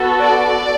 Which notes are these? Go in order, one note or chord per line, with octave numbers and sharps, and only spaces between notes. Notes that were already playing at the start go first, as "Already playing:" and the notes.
Already playing: B3 F#4 A4
D5